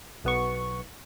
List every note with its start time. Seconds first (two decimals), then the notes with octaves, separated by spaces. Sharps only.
0.24 B1 B3 C#6